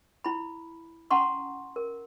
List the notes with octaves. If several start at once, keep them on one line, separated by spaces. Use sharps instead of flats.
E4 B5
C#4 F#5 A5 A#5 C6 C#6
A#4